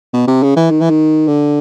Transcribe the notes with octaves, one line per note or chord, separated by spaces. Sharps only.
B2
C3
C#3
E3
D#3
E3
D#3
D3